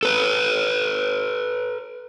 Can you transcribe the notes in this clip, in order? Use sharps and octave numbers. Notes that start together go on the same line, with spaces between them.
A4 B4